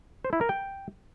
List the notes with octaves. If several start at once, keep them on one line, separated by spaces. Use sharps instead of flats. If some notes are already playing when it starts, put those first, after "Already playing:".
C5
E4
A#4
G5